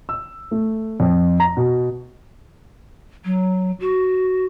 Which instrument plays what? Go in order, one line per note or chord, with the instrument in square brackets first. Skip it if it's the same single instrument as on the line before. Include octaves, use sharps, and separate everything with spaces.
[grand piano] E6
A3
F2
A#5
B2
[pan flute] F#3
F#4